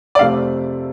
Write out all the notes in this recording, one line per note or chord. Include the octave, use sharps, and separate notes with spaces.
D5
F2 C3 A3 C4 F5